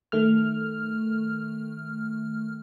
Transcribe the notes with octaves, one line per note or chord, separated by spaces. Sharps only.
D#3 A3 F6